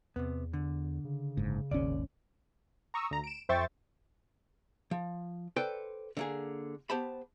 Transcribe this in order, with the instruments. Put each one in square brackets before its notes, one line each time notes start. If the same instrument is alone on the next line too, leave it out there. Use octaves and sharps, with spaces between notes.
[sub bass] E2 [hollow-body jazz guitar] C3 B3
[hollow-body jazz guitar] D3
[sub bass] C#3
[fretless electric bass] F#1 G#2
[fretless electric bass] D#1 G#1 C#4 [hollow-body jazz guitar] D#2 D5
[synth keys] A#5 C#6 D#6 E6
D2 A#5
D7 E7
F2 C5 E5 G5 C#6 A6
[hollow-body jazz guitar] F3
A4 B4 C5 D5 G5
D3 A#3 G#4
B3 G4 C5 A5 B5